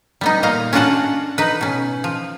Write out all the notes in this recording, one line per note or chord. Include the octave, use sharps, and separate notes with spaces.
G3 B3 D#4
A#2 D#5 F5 A#5
C#4 D4 F4 F#4 F#5 A5
D#4 B4
B2 C#4
F3